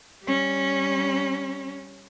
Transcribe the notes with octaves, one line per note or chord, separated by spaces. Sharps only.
G3 C#4